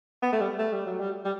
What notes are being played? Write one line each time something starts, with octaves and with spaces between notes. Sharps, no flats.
B3
A3
G3
A3
G3
F#3
G3
G3